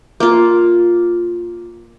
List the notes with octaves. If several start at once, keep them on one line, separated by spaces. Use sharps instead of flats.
A#3 F4